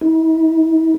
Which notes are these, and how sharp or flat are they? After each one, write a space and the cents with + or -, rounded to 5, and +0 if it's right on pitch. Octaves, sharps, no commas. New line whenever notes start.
E4 -40